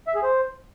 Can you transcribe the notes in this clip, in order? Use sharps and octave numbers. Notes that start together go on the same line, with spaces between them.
E5
G#4
C5